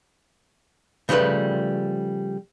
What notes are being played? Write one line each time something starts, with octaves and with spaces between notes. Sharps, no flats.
C#3 F3 G3 A3 B4